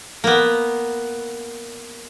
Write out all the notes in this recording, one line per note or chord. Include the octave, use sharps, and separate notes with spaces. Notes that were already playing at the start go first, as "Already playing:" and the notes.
A#3 B3